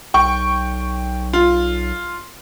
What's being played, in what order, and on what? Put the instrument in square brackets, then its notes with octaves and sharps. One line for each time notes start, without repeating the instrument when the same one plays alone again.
[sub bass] B1 [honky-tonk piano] G5 C#6
[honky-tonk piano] F4